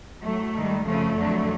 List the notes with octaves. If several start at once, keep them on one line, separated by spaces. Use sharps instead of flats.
A2 F#3 A3
G#2 D#3 G3
F2 C#3 F3 A3
F2 D3 F#3